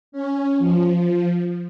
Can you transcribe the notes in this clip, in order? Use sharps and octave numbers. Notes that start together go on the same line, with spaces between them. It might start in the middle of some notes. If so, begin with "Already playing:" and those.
C#4
F3